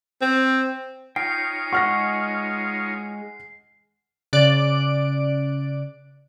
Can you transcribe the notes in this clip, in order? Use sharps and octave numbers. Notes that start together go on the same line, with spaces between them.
C4
D#4 F4 C#5 G5 C7
G#3 F#5 C#6 F6 A#6
C#3 D5 F#6 D7